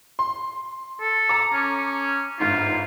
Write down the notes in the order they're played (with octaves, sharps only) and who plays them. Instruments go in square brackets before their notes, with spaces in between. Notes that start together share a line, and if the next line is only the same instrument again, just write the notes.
[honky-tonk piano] C6
[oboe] A4
[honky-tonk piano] A#5 D6
[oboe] C#4
[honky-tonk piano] G1 G#2 [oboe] F4